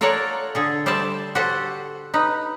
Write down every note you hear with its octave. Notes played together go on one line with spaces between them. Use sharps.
F4 A4 A#4 C#5 D5 F#5
D3 G#4 A4
G3 C5 D5 E5 A5
F#4 G4 A4 C5 F#5
D#4 B4